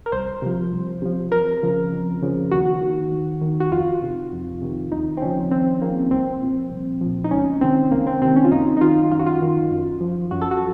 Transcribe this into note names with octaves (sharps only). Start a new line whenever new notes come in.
A#4
C2 C5
C3 F3
C2
C3 F3
F2 A#4
C#3 F3
F2
C#3 F3
D#2 F#4
D#3
D#2
D#3
F#4
F2 F4
C3 D#3
F2
C3 D#3
D#2 D#4
C4
C#3 F3 C#4
D#2 C4
C#3 F3 A#3
C2 C4
A#2 F3
C2
A#2 F3
D#4
C#2 C#4
C3 D#3 C4
C#2 A#3
C4
C3 D#3 C4
C#4
F4
F#2 D#4
D#4
D#3 F4
F#2 F4
F#4
F4
D#3
F#2
F3
F#2 F#4
A4
F#4